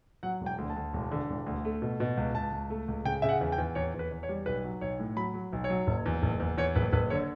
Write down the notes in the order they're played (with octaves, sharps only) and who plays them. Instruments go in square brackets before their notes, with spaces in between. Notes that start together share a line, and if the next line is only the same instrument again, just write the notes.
[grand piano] F#3 F#5
E1
G5
D2
A5
D2
E1
D3
E1
D2
A3
B2
B2
C#2
C#2 A5
C#2
A3
C#2
C#3 G5
C#3 E5
F#5
E2
G5
E2
E2 C#5
E2
B4
E2
C#5
G3
B1 B4
F#3
B1 C#5
A2
F#3 B5
F#3
B1
C#5
F#3
F#1
E2
F#1
E2
E2 C#5
F#1 B4
F#1 B4
D3 C#5